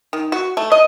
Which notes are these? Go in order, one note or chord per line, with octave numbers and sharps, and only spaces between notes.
D#3
F#4
A3
D#5